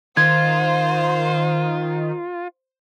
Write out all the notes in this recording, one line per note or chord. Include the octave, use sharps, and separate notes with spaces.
D#3 F4 C5 G#6